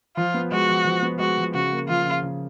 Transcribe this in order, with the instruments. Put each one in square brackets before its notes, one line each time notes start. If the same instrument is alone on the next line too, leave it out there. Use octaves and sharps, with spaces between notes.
[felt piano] F3 [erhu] F4
[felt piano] B3
[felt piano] G#3 [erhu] F#4
[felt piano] F3
F3
B3
[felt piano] G#3 [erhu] F#4
[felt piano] F3
[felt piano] C#3 [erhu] F#4
[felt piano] A#3
[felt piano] F3 [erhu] F4
[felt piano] C#3
C#3